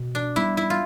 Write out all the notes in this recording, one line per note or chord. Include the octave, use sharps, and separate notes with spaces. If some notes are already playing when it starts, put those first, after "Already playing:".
Already playing: B2
D4
G3 B3 E4
E4
F4